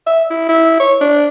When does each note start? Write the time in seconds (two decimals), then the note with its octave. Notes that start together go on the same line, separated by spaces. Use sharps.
0.07 E5
0.30 E4
0.49 E4
0.80 C#5
1.01 D4